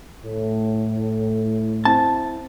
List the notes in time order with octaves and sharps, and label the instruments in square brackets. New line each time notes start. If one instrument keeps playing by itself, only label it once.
[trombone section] A2
[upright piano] C4 E4 [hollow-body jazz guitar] A5